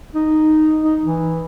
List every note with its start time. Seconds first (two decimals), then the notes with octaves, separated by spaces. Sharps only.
0.15 D#4
0.83 D#4
1.03 E3